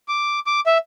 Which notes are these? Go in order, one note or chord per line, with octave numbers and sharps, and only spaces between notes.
D6
D6
E5